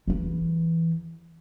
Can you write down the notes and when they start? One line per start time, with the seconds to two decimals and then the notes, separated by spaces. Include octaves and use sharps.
0.08 E2 E3